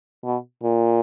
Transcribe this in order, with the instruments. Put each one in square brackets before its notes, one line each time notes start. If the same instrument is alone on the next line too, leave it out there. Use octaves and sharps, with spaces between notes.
[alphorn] B2
A#2